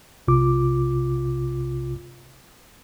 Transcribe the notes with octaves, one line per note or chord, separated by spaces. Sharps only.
B1 C3 F4 D6